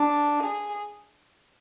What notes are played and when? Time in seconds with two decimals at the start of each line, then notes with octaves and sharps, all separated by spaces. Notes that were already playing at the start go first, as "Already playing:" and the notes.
Already playing: D4
0.44 G#4